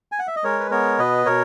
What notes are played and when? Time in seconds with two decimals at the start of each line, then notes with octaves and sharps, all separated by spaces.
0.12 G#5
0.19 F#5
0.27 E5
0.36 D#5
0.44 G#3 A#4 C#5
0.60 B4
0.71 B3 A#4 C#5
0.99 B2 B4 D#5
1.26 B2 A#4 C#5